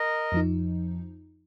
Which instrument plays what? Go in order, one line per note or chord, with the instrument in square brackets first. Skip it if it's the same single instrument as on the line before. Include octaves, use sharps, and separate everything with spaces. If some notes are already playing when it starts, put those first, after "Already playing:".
Already playing: [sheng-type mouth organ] A#4 D#5
[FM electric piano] F2 F3 D#4